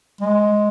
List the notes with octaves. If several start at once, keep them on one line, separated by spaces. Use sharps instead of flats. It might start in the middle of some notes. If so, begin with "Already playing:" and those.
G#3